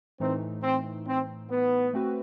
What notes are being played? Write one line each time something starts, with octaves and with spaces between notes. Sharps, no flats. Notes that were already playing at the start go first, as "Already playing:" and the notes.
A2 E3 A3 C4 D#4
C4
C4
B3
A3 C4 F#4 B4